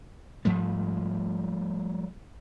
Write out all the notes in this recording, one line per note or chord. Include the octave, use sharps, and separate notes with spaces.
G#2 F3 G3 A3